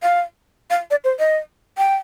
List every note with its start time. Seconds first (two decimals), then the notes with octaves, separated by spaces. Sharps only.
0.03 F5
0.70 F5
0.91 D5
1.04 C5
1.19 D#5
1.78 G5